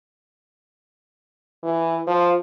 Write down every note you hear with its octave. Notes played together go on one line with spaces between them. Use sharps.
E3
F3